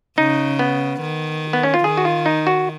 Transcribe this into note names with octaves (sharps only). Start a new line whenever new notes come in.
C#3 D#4
B3
D#3
B3
C#4
F4
D#3 G#4
F#4
F4
D#4
F#4